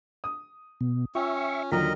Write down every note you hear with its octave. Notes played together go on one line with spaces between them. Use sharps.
D#6
B2
C#4 F4 E5 G5 C#6
D#2 D3 F#3 F4 A#4 D#5 A#5 B6